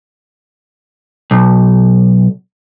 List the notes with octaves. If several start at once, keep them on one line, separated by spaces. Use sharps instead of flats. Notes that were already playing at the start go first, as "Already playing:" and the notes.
B1